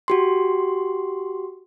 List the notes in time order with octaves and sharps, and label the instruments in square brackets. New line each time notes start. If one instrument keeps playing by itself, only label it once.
[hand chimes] F#4 G4 C6